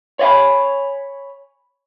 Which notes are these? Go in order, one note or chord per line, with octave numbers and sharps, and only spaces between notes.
C#5 D5 E5 G#5 B5